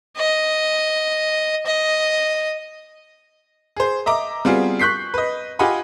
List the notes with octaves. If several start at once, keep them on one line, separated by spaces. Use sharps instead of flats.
D#5
D#5
G#4 C5
D#5 E5 A#5 D6
G3 B3 C4 F4 F#4 G#4
C#6 F#6 G6 B6 C7
B4 D#5
F4 G4 D#5 F#5 G#5 B5